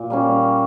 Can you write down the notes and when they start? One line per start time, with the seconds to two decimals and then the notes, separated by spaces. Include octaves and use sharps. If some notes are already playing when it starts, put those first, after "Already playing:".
Already playing: A#2
0.10 G3 A#3 C#4